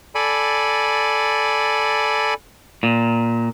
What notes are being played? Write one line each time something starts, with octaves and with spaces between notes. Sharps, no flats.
A4 D5 G#5 B5
A#2